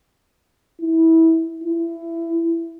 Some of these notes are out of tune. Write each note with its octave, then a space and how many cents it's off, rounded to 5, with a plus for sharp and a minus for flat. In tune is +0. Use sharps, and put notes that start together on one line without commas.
E4 -20
E4 +20